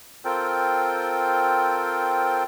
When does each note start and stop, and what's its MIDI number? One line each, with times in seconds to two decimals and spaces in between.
0.25 2.43 60
0.25 2.43 65
0.25 2.43 69
0.25 2.43 70
0.25 2.43 72
0.25 2.43 79